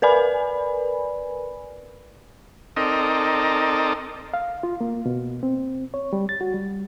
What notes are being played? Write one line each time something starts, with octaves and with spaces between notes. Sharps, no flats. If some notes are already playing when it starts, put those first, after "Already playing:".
A#4 B4 D5 G#5 B5
C4 D#4 A4 A#4 D5 D#5
F5
F4
A#3
B2
C4
C#5
G3
A6
F#4
G3